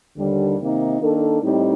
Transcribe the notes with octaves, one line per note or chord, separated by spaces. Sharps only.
D#2 D3 G3
C3 D#3 A#3 D#4
D#3 A#3 D4 A4
A2 G3 C4 D#4